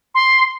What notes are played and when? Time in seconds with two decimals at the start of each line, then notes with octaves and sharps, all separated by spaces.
0.15 C6